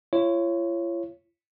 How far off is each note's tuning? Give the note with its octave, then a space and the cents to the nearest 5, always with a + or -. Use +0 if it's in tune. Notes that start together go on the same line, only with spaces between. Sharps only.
F4 -45 C#5 -10